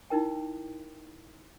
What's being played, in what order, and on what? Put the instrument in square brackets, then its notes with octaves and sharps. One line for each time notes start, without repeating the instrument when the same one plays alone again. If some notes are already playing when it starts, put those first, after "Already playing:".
[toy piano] D#4 E4 A#4 G5